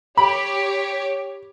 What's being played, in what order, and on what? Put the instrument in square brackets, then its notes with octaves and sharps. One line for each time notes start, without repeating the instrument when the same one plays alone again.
[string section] G4 C#5 [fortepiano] B5